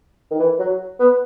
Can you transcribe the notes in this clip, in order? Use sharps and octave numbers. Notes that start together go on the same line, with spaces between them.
D#3
E3
F#3
B3